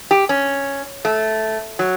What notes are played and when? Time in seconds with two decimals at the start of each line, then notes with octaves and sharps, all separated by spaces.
0.11 G4
0.29 C#4
1.05 A3
1.79 F#3